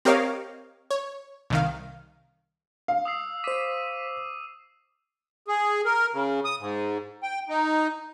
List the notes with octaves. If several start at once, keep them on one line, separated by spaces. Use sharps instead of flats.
C4 G4 A#4 C#5 D#5 F5
C#5
C2 D#3 F5
F5
D#6 E6 C7
C5 D6 B6 D#7
G#4
A#4
C#3
D#6
G#2
G5
D#4